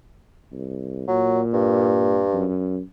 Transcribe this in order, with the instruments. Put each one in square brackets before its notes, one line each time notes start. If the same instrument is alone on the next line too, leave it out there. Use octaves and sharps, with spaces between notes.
[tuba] C2
[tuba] A#2 [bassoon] F#3
[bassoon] G2
[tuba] F#2